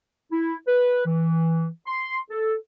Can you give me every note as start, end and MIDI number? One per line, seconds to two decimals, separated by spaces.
0.31 0.54 64
0.67 1.04 71
1.05 1.66 52
1.86 2.17 84
2.30 2.54 69